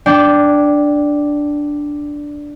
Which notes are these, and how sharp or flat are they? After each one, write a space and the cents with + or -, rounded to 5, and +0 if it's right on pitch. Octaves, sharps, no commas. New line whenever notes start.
D4 +0 D5 -30 G5 +0